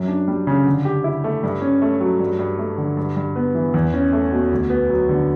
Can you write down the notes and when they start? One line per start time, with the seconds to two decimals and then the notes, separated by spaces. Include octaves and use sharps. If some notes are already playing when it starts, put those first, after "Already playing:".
Already playing: F#2
0.08 D4
0.28 G3
0.47 C#3
0.66 D3
0.85 G4
1.04 E4
1.24 A3
1.43 G2
1.62 C#4
1.82 A3
2.01 F#3
2.20 G2
2.39 G2
2.59 A3
2.78 D3
2.97 G2
3.17 G2
3.36 B3
3.55 E3
3.74 E2
3.93 C#4
4.13 A3
4.32 B2
4.51 D2
4.70 B3
4.90 F#3
5.09 D3